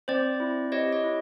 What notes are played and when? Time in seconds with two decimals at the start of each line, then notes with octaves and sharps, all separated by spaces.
0.08 C4 C5 D5
0.40 E4
0.72 G4 C#5 D#5
0.92 C#5 D#5
1.04 E4